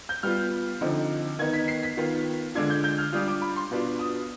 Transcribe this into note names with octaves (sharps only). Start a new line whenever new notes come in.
G6
G3 B3 F4 F6
D3 F3 C4 D#4
D#3 B3 D#4 G#6
B6
C7
B6
D#3 B3 F4
D3 G#3 D4 F4 G#6
G6
G6
F6
G3 D4 F4 D#6
D6
B5
C6
B2 B3 D4 F4
D#6